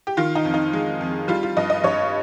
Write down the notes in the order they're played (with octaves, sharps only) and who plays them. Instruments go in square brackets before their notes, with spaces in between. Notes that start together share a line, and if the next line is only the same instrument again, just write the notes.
[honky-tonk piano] G4
D#3 F4
D#4
F2
D#4
G#3
F2
G3 F4
F4
G2 D#5
D#5
G2 C#5